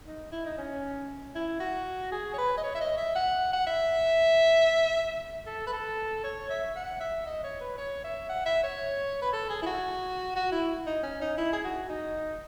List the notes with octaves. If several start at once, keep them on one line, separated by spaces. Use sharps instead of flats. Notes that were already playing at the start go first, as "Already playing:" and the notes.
D#4
E4
D#4
C#4
E4
F#4
G#4
C#5
B4
D#5
C#5
E5
D#5
E5
F#5
F#5
E5
A4
B4
A4
C#5
E5
F#5
E5
D#5
C#5
B4
C#5
E5
F#5
E5
C#5
B4
A4
G#4
E4
F#4
F#4
E4
D#4
C#4
D#4
E4
G#4
F#4
D#4